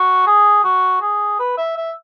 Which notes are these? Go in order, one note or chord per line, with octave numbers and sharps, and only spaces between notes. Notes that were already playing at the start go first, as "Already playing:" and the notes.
Already playing: F#4
G#4
F#4
G#4
B4
E5
E5